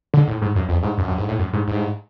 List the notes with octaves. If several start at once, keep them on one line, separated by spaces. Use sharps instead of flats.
D3
A2
G#2
F#2
F2
G#2
F#2
F#2
G#2
A2
F#2
G#2
G#2